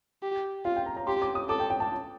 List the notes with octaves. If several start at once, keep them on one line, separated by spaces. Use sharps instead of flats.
G4
F4 F5
G5
A#5
A#5
G4 C6
D6
D#6
A4 D6
G5
G5
A5